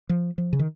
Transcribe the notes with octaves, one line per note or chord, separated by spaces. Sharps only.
F3
F3
C#3
D#3